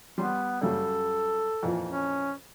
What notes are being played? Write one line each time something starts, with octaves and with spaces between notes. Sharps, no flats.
G3 B3 C6
F#2 C#3 G3 A4
F2 A#2 E3
C#4